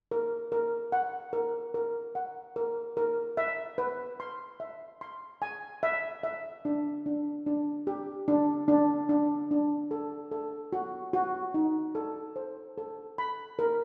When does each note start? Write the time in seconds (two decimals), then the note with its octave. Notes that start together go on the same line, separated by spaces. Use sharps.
0.11 A#4
0.52 A#4
0.92 F#5
1.33 A#4
1.74 A#4
2.15 F#5
2.56 A#4
2.97 A#4
3.37 E5
3.78 B4
4.20 C6
4.60 E5
5.01 C6
5.42 G#5
5.83 E5
6.23 E5
6.65 D4
7.06 D4
7.46 D4
7.87 G4
8.28 D4
8.68 D4
9.09 D4
9.51 D4
9.91 A4
10.31 A4
10.73 F#4
11.13 F#4
11.54 D#4
11.95 A4
12.36 C5
12.78 A4
13.18 B5
13.59 A#4